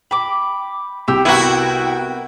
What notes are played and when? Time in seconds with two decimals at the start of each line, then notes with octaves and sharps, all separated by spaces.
0.11 G5 B5 D6
1.08 C2 G4 G5 E6
1.25 B3 E4 F#4 A#4